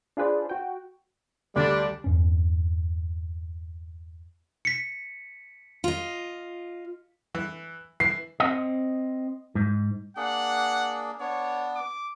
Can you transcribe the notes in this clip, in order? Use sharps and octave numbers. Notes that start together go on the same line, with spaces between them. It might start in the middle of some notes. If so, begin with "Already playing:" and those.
D4 F4 G#4 B4 C5 D5
F#4 G5
D2 G3 D4
E2 G2 C#4
B6 C#7
F4 D#5
E3
E3 C7
C4 D#5
G#2
A#3 D4 G#4 F#5
B3 D4 C#5
D6